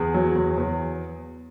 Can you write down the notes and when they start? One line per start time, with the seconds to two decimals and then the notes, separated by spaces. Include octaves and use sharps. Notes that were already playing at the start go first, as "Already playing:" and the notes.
Already playing: E2 G#4
0.14 F#3
0.36 E2
0.57 E2